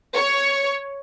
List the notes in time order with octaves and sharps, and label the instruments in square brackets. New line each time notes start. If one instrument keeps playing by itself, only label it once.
[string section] C#5